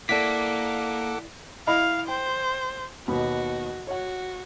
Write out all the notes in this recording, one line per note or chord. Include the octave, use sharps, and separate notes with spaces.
A#3 E4 A4 D5 F#5 D6 B6
E4 D#5 F5 B5
C5 G5
D#2 B2 F#4
F#4 C#5 F#5